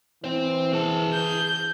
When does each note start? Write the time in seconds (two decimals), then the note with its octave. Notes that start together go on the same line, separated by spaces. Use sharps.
0.24 E3 C4 C5
0.73 G#4 A5
1.13 G6